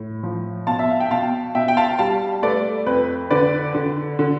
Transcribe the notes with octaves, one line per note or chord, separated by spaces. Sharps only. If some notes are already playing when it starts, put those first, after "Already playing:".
Already playing: A2
F3
B2 F5 A5
E5
F5
G5
B2 F5 A5
B2 E5 G5
G5
F5 A5
G3 F5 A5
A3 B4 D5
F2 B4
D3 B4 D5
D3
D3